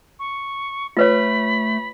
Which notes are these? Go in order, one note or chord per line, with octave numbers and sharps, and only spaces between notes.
C#6
A3 F4 B4 C#5 B5